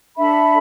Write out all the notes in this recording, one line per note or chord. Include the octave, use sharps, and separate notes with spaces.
D4 A4 E5 B5